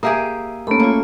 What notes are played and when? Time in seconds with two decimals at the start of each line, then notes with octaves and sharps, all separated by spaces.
0.03 A#3 G4 G#4 E5 D#6
0.67 A3 A#3 C#4 B5
0.80 A#3 F4 C#5